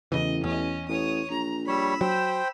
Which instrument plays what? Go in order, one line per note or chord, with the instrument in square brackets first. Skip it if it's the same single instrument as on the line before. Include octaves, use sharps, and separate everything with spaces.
[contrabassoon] A1 [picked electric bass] E2 C#3 E3 [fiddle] D#5
[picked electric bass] E2 [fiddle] C#4 D#5
[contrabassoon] A1 [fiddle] C#5 D#6
[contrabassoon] A#1 [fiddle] A#5
[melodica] G3 C#5 [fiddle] B5 E6
[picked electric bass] F#3 [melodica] C5 G5